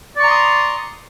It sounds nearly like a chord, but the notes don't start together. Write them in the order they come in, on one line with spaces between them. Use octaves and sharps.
D5 C#6 A#5 C6 D#6